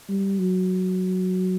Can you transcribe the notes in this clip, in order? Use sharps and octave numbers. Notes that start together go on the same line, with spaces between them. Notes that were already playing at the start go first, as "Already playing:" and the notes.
G3
F#3